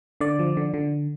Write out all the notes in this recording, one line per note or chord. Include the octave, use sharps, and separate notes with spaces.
D3 D5
F3
D3
D3